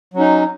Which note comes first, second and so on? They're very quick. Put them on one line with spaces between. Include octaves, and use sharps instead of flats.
F#3 C#4 D#4